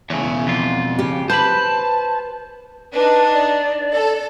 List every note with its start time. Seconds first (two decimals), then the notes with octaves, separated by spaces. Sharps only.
0.10 E2 C#3 A3 C5 C#5
0.22 B2 B3 E4
0.47 F2 F4
0.99 C#3 G4
1.30 B4 C5 A5 B5
2.94 D4 D#4 B4
3.33 D5
3.93 A4